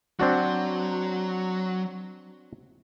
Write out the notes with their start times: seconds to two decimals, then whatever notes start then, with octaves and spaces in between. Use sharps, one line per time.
0.20 F#3 C4 D4 F#4